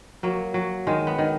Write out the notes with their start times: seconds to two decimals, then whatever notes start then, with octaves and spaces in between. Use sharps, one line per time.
0.23 F#3 A#3
0.54 F#3
0.87 D#3 G#3
1.07 B3
1.18 D#3